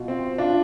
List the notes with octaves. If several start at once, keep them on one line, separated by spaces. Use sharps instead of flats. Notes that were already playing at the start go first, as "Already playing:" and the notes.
Already playing: B2 F4
C4
D4 F4